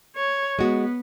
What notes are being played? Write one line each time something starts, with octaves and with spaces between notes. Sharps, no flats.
C#5
G#3 B3 F#4